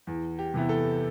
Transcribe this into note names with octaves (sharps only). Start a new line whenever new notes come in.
E2
G4
C3 E3 B3 E4
A4